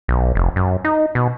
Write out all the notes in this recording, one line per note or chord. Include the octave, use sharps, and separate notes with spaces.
B1
F1
F#2
D#4
B2